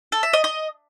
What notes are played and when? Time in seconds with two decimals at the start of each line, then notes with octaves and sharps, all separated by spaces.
0.12 A4
0.23 E5
0.33 D#5
0.44 D#5